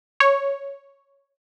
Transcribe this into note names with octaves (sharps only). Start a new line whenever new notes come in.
C#5